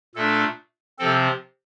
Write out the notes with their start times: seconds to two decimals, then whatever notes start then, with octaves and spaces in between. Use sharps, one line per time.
0.15 A#2 A3 D4 A4
0.99 C3 F3 C4 A4